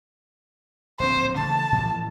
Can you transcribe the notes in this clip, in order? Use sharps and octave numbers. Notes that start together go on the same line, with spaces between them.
D1 A#1 C4 C5
C#3 E3 A3 A5
A2 E3 F3